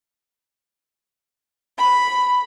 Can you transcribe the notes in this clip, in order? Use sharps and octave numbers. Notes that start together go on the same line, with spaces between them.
B5